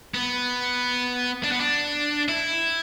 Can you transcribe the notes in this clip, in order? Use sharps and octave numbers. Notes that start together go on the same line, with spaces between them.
B3
D4
B3
D4
E4